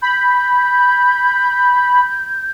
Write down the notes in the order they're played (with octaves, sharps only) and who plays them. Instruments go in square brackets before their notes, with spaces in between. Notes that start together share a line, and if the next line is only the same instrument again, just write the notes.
[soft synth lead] B5 [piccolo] G6